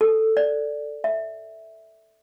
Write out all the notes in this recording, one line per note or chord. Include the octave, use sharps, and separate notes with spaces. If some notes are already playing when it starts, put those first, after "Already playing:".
A4
D5
E5